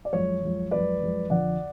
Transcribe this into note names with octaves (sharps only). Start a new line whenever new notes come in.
D5
F#2 F3 G#3 C#5
F#2 F3 G#3
F#2 F3 G#3 B4 D5
F#2 F3 G#3
F2 D3 F3 D5 F#5